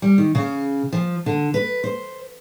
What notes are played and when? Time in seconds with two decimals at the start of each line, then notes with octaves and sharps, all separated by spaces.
0.02 G3
0.18 D#3
0.35 C#3
0.93 F3
1.26 D3
1.54 B4
1.84 C5